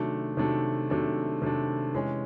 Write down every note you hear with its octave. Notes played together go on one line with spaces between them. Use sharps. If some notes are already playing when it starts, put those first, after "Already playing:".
Already playing: C3 D#3 F#3 A3 D4
C3 D#3 F#3 A3 D4
C3 D#3 F#3 A3 D4
C3 D#3 F#3 A3 D4
C3 E3 G#3 C#4